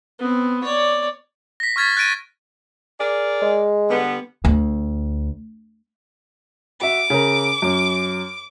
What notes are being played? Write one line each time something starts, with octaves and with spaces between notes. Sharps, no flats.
B3 C4
C#5 D5
A#6 B6
C#6 F6 G#6 A6 B6
F#6 A6 D7 D#7
G#4 A#4 D5
G#3
D3 G3 B3
D2
F#4 E5 D6
C#3 A#4
F#2